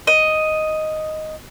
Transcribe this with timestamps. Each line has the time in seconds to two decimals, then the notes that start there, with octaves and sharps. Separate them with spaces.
0.07 D#5